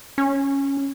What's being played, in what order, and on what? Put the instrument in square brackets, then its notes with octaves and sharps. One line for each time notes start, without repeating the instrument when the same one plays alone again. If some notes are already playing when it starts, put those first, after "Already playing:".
[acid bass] C#4